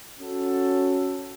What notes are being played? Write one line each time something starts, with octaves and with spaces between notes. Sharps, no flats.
C#4 F#4 A4